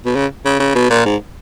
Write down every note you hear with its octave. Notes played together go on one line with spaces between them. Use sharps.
B2
C#3
C#3
C#3
B2
A#2
G#2